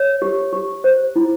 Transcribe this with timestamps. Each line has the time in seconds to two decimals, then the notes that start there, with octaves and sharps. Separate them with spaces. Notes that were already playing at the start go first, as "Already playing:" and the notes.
Already playing: C#5
0.22 G4
0.53 G4
0.84 C5
1.16 E4